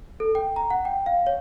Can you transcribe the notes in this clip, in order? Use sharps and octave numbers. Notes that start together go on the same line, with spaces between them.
A4
G5
A#5
F#5
G5
F5
C#5